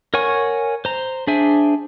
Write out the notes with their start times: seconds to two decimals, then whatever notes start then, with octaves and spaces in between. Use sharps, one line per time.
0.14 A#4 C#5 F#5 G#5 C#6
0.85 C5 A#5
1.27 D4 G#4 C5 E5 G#5